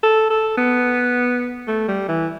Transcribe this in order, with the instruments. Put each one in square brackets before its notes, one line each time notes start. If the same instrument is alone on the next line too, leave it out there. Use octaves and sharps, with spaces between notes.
[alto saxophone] A4
A4
B3
A3
G3
E3